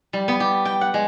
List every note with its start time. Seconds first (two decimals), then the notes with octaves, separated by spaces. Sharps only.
0.13 G3
0.28 B3
0.40 G4
0.65 G5
0.81 F#5
0.94 G#3